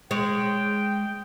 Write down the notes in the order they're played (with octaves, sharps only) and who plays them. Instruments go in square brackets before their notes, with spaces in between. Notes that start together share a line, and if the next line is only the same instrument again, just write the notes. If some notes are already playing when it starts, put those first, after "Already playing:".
[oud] G#3 C#5 [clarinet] G5